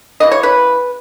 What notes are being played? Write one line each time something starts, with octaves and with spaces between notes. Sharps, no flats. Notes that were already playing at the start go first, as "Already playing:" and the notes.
C#3 E3 D#5
C#5
B4